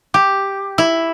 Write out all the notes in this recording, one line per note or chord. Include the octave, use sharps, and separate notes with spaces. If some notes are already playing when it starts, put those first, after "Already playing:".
G4
E4